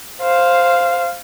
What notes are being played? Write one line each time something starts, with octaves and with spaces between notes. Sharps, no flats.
C5 F5